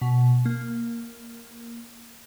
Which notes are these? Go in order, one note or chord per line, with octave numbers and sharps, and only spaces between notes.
B2
A#3